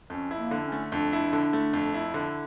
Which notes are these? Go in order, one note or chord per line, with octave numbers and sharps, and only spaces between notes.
F2 C#4
E4
A#3
D3
C#4
A3
F2 D4
E4
D3
A3
F2
E4
D3